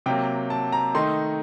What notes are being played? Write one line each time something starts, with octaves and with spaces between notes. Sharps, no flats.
C3 F#3 A#3 G5
A5
A#5
D#3 A3 D#4 C6